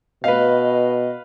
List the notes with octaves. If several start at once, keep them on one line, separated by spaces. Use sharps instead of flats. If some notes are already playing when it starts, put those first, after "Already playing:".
B2 B4 D#5 F5